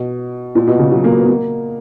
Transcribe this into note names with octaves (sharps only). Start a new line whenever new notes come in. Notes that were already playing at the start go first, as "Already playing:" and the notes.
Already playing: B2
A#2
B2
C#3
F#3
A#3
B3
A#3